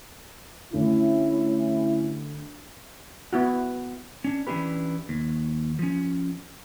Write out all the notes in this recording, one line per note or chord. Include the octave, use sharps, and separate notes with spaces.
D2 C#4 E4
B3 E4 F#4
C#4 D4
E3 C#4 D4 E4 G4 B4
D#2
F3 C#4